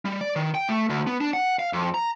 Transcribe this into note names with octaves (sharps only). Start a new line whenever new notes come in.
G3
D5
D#3
G5
A3
D2
B3
D4
F#5
F5
F2
A#5